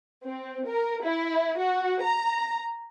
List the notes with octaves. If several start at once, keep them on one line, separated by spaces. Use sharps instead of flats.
C4
A#4
E4
F#4
A#5